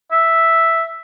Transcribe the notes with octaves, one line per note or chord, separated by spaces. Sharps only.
E5